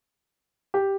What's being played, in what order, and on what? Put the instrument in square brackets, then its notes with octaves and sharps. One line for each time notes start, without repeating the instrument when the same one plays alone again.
[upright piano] G4